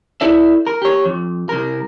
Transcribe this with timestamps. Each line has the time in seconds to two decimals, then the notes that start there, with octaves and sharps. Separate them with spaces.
0.21 E4 A4 D5 E5
0.67 A#4
0.82 G4 C#5
1.06 F2
1.49 C2 A#4